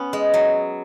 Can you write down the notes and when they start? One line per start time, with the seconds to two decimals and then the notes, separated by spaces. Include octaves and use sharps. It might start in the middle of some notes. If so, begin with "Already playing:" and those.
Already playing: B3 C#4
0.13 G#3
0.34 F#3